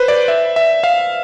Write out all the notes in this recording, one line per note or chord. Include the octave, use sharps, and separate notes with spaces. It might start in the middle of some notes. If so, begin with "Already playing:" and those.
Already playing: B4 C5
D5
E5
E5
F5